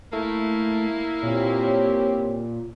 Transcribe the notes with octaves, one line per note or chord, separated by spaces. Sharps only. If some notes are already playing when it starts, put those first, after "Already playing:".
A3 A#3 E4
A#2 C4 G4 C#5